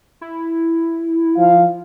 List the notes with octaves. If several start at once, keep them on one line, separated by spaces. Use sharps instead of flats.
E4
F3 F5